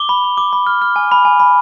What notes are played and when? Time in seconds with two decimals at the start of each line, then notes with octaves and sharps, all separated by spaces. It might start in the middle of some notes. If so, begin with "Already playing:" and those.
Already playing: D6 G7
0.09 B5
0.24 B5
0.38 D6
0.53 B5
0.67 F6
0.82 F6
0.96 G#5
1.12 B5
1.25 G#5
1.40 B5